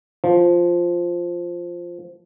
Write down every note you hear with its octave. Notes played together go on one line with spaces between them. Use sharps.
F3